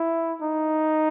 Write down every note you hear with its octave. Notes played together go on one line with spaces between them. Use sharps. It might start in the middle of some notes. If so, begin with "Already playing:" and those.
Already playing: E4
D#4